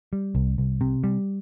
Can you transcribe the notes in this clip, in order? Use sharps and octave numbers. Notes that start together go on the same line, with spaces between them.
G3
C2
C2
C3
G3